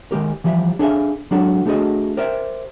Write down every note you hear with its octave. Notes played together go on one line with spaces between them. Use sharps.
D#3 G#3 G4 A#4
E3 F3 G3 E5
D4 G#4 A4 D5 E5 F5
F#3 G#3 D4 F#4 G4 A4
A3 D4 F#4 G#4 A4 D#5
G4 A#4 C5 D5 E5 G5